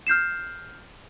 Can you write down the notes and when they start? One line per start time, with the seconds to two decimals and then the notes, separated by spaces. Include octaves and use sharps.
0.07 F6 G6 C7 E7